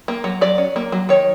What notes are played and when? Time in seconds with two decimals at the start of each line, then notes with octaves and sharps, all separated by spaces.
0.08 A#3
0.24 F#3
0.41 F#3 D5
0.58 C#4
0.76 A#3
0.92 F#3
1.09 D#3 C#5